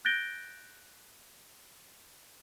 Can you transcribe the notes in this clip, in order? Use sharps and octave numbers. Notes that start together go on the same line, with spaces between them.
F#6 G6 A6 A#6 D7 G7